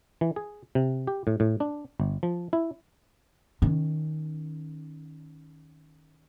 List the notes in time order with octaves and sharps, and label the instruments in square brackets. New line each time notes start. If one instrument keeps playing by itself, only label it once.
[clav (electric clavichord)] E3
G#4
C3
G4
A2
A2
D4
G1
F3
E4
[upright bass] D#3 C#4